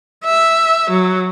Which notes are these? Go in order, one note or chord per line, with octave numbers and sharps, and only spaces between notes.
E5
F#3